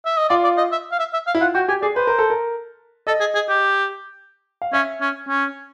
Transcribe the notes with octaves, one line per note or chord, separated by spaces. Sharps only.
E5
D#5
F4 D5
D5
D#5
E5
F5
E5
E5
F5
E4
F4 F#5
F#4 G5
G4 G#5
G#4 D5
B4 C5
A#4
A4
A#4
A4 D#5
G#4
G#4
G4
F5
C#4 E5
C#4
C#4